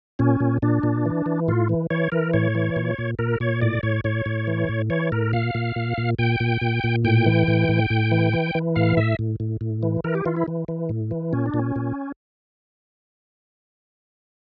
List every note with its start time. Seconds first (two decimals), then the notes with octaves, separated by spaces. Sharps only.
0.19 A#2 C#4
0.40 A#2
0.62 A#2 D4
0.83 A#2
1.06 E3
1.26 E3
1.48 A2 F4
1.69 E3
1.90 E3 C#5
2.12 E3 A#4
2.34 A2 C#5
2.55 E3
2.76 A#2
2.98 A#2
3.19 A#2 A#4
3.40 A#2 C#5
3.61 A2 D5
3.83 A2 C#5
4.04 A2 C#5
4.26 A2
4.47 E3
4.69 A2
4.90 E3 C#5
5.12 A2 A#4
5.33 A#2 F5
5.55 A#2
5.76 A#2
5.98 A#2
6.19 A#2 G5
6.40 A#2
6.61 A#2
6.84 A#2
7.05 A2 G5
7.26 E3
7.48 A2
7.69 A2
7.90 A2
8.12 E3
8.33 E3
8.55 E3
8.76 A2 F5
8.97 A2 E5
9.19 A2
9.40 A2
9.61 A2
9.83 E3
10.04 E3 A#4
10.15 G4
10.26 E3 F4
10.36 E4
10.48 E3
10.68 E3
10.89 A2
11.11 E3
11.33 A#2 C#4
11.46 D4
11.54 A#2
11.59 C#4
11.76 A#2